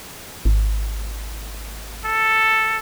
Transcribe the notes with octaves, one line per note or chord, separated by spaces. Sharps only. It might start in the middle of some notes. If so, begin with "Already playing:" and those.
G#1
A4